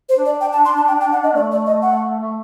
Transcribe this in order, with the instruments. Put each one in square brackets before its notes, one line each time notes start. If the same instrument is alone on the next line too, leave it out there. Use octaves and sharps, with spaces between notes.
[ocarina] C5
[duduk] D4
[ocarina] D5
G5
A5
C6
A5
G5
G5
F#5
D#5
[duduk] A3 [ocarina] D5
[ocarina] D5
D#5
F#5
[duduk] A3